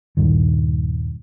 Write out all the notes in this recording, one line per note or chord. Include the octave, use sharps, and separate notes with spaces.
D#1 A#1 G2 D#3